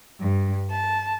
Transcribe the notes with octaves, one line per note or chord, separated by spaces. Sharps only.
G2
A5